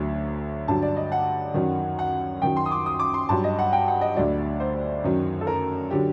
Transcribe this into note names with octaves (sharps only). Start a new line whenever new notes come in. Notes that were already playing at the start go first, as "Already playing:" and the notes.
Already playing: D2 D3 F#3
G2 D3 F#3 A5
D5
D#5
F#5
F#2 D#3 F#3
F#5
F#2 D#3 F#3 G5
C6
D#6
D6
D#6
D6
C6
G2 F#3 A5
D#5
F#5
G5
F#5
D#5
D2 D3 F#3 D5
C5
F#2 D#3 F#3
A4
A#4
D3 F#3 G4